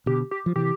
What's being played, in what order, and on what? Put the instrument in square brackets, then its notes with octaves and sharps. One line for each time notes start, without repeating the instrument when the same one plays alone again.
[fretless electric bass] B2 D3 [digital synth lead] G4
[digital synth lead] G4
[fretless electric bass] F3
[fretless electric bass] C3 E3 [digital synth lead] G4